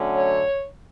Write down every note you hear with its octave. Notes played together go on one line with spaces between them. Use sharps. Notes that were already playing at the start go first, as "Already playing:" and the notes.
Already playing: D3 F#3 A3 C#4
C#5